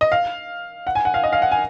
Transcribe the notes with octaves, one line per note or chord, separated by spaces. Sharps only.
D#5
F5
F#5
G#5
F#5
F5
D#5
F5
F#5
G#5